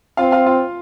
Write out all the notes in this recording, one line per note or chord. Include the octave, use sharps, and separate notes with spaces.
C4 F4 F5
F4 F5
F4 F5